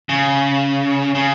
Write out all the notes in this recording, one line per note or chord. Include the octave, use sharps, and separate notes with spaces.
C#3
C#3